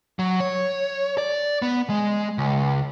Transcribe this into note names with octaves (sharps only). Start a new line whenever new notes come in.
F#3
C#5
D5
B3
G#3
C#2